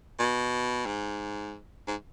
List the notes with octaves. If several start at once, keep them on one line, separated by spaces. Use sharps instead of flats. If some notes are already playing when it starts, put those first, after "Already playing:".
B2
G#2
G#2